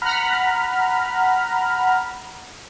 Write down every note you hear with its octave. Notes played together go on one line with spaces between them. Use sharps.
F#5 A#5 B5 F6